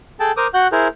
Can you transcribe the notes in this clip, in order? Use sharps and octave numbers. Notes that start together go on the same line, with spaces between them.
G#4 A4 G5 A5
A#4 C5 D6 D#6
F#4 F#5 F#6 G6
E4 G#4 A#4 C5